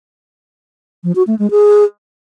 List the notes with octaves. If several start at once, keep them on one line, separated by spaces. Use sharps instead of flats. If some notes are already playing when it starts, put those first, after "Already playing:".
F3
F#4
A3
G#3
G#4